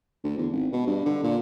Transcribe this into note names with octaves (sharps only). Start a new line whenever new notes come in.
D2
E2
G#1
B2
G2
D3
A#2